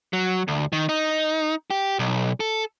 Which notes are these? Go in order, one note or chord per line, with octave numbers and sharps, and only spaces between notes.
F#3
D2
D#3
D#4
G4
B1
A4